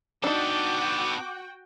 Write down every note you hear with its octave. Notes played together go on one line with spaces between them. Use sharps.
B3 D4 D#4 F#4 A4 G5 D6